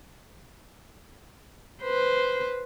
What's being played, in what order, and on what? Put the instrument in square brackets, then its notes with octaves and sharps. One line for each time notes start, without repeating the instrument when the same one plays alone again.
[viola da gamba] B4 C5